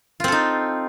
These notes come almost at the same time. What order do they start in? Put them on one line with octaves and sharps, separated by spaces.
F4 C4 A4 D#4